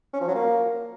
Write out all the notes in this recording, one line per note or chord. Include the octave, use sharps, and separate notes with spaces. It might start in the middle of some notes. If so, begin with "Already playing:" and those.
C#4
F3
F#3
A#3